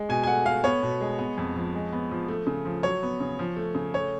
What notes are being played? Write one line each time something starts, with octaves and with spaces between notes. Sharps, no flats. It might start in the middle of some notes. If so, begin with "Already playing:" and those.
Already playing: G#3
B2 G#5
G#5
A3 F#5
A3 F5
B3 C#5
B2
G#3
B3
F2
F3
G#3
B3
F3
A3
C#3
F3
F#3 C#5
B3
C#3
F3
A3
C#3
A3 C#5